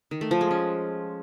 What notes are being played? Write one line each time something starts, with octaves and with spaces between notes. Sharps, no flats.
D#3
A3
F3
G#3
C#4